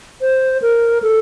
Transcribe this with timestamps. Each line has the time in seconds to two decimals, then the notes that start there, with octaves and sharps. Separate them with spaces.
0.21 C5
0.62 A#4
1.02 A4